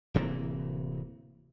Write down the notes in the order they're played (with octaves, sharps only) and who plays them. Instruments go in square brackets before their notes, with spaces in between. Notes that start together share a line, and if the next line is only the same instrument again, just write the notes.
[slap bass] D1 C3 E3 A#3